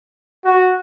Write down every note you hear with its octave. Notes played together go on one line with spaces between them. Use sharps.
F#4